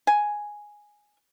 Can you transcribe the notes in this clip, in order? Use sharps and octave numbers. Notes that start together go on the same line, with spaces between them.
G#5